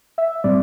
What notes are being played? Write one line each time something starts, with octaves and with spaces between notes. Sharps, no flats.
E5
A2 G3 C4 D5